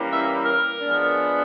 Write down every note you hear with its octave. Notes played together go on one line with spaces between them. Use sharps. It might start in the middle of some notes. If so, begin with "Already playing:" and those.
Already playing: E3 G3 A#3 C#4
E5
A#4
F3 G#3 B3 D4